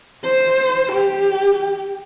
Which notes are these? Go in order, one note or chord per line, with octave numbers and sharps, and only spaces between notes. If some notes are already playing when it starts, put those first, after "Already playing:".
C5
G4